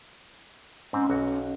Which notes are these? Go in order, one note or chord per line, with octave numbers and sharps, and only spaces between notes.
G#2 C4 C#4
B1 F#4